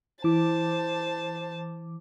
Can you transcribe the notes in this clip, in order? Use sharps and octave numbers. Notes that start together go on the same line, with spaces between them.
E3 E4 C5 A5 D6